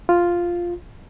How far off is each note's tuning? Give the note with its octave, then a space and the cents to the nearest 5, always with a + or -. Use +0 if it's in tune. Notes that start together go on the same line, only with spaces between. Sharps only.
F4 +0